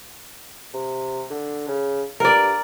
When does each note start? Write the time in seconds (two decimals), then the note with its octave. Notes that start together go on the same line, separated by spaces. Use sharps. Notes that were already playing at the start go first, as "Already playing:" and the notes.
0.74 C3
1.30 D3
1.68 C#3
2.20 G2 A#4 D5